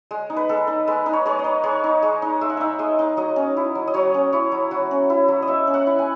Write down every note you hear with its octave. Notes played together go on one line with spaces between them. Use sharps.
G#3
D#4
B4
G#3 A4
D#4
G#3 B4
D#4
C#5
G#3 C#5
D#5
D#4
G#3 C#5
D#4
G#3
D#4
G#3 E5
F#5
D#4 E5
G#3 D#5
D#4
F#3 D#5
C#4
E4
F#3
D#5
F#3 C#5
C#4
E4 C#5
F#3
F#3 F#4
C#4
E4
F#3
D#5
F#3 E5
C#4
F#5
E4
G#5